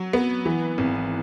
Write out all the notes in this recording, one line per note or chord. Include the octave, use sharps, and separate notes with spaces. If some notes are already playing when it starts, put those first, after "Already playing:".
Already playing: F#3
B3
E3
G#1